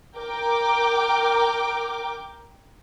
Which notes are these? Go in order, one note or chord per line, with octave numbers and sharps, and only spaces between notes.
A#4 G5 D6